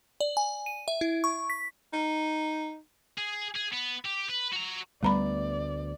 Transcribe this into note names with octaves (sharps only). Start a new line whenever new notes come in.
D5
G#5
D#7
E5
E4
C#6
B6
D#4
G#4
G#4
B3
G4
B4
F#4 A#5
D2 G3 A3 B3 D5 A#5 B5